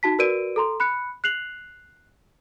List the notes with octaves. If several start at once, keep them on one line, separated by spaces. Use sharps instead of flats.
D#4 F#4 A5 B6
F#4 A#4 B4 D5 D7 D#7
A4 A#5 C6
B5 F#6 C#7
F#6 C7 F7 F#7